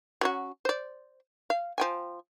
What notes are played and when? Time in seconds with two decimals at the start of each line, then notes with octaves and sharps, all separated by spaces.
0.21 F#3 C#4 F#4
0.65 C5 D5
1.50 F5
1.78 F3 G5 G#5